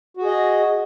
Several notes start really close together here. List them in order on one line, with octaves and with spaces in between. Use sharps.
F#4 G#4 D#5